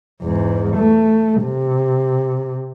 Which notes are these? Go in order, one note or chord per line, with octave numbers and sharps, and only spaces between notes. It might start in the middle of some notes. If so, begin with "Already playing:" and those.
E2 G#2
A3
C3